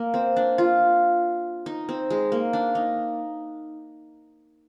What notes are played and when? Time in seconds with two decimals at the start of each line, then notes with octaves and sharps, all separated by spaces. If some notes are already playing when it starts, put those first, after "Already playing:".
Already playing: A#3
0.14 C4
0.37 D4
0.58 F4
1.66 D#4
1.89 C4
2.10 G#3
2.32 A#3
2.53 D4
2.75 D#4